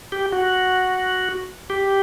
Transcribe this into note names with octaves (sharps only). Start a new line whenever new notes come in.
G4
F#4
G4